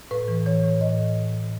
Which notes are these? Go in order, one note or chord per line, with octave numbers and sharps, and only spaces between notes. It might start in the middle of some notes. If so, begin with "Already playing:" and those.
A2 B4
E3
E3 C#5
A2
A2 D#5